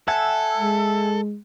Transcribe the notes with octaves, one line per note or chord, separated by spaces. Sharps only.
A4 E5 F#5 G#5
G#3